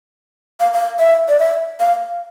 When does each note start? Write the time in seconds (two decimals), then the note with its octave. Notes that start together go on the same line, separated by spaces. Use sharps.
0.60 F5
0.74 F5
0.99 E5
1.29 D5
1.39 E5
1.80 F5